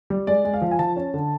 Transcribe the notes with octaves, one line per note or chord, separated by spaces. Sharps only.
G3
G#3 D5
G#3
F5
F3
G#5
F3 A5
C#4
D3